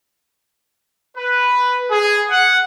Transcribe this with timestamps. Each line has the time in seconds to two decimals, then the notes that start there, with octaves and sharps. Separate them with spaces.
1.17 B4
1.90 G#4
2.30 F#5